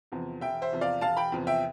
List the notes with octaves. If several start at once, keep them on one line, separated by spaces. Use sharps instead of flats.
E2 C3 F3
E1 E5 G5
C5 E5
E2 C3 F3
D5 F5
E1 F5 A5
G5 B5
E2 C3 F3
E5 G5